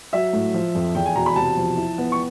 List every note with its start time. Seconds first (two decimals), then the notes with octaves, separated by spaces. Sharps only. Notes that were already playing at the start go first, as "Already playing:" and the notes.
0.13 F#3 E5
0.33 A2
0.54 F3
0.75 F2
0.95 E2 G5
1.05 G#5
1.16 B2 A#5
1.26 B5
1.36 C3 A5
1.57 F3
1.77 E4
1.98 B3
2.12 C#6